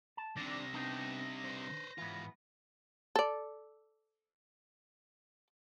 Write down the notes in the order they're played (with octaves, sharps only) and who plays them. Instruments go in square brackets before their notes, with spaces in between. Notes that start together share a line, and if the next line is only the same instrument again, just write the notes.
[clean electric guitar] A5
[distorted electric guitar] C3 G3 [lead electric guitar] D#3 D4 [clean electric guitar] D5 [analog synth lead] A#6
[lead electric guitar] B3 C4 [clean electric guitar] D4 D#4
[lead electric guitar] B4 C5
[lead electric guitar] G#2 F4 [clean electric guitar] E3 B3
[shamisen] A4 D5